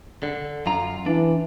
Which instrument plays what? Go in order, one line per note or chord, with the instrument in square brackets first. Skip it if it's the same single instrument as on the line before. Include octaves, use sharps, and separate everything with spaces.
[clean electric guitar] D3
F#2 F4 A#5
[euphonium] E3 [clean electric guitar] D4